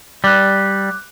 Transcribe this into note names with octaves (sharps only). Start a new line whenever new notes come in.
G3 D6 F#6